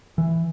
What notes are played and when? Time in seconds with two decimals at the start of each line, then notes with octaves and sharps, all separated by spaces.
0.18 E3